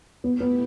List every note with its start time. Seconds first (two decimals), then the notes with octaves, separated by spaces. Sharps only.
0.24 B2 A3 B3 E4 G4
0.40 B3